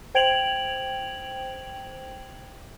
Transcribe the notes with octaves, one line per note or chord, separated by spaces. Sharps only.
C5 G5 G#6 D7 F7 F#7